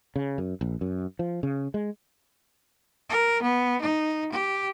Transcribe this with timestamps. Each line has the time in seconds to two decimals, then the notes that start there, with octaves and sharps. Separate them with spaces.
0.16 C#3
0.38 F#2
0.61 A#1
0.81 F#2
1.19 F3
1.43 C#3
1.74 G#3
3.10 A#4
3.42 B3
3.81 D#4
4.32 G4